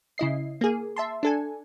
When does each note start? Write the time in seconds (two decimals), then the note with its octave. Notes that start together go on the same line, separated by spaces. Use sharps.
0.18 C#3 E4 D#5 C7
0.61 A#3 G#4
0.96 E5 A5 C6
1.23 D4 A4 G#5